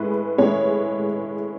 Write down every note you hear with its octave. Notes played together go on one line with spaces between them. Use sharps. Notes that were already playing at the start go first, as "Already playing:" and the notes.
Already playing: A2 G#3 B4
A2 G#3 C#5